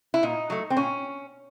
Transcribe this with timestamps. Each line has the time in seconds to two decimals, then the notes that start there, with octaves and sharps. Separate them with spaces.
0.14 E4
0.23 A#2 D#4
0.50 F#3 A3
0.70 C4
0.77 A#2 C#4